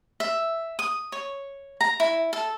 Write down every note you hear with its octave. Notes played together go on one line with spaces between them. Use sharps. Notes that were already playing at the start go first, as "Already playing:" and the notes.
E5
D#6
C#5
A#5
E4
A4